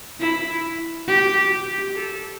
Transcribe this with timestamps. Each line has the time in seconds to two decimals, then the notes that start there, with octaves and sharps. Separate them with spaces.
0.20 E4
1.08 G4
1.51 G4
1.95 A4